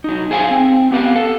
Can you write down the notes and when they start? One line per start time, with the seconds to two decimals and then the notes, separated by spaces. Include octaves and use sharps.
0.04 F#3 D#4
0.31 G#4 C5 F5 G#5
0.51 C4
0.91 B3 G4 B4 F5
1.16 A4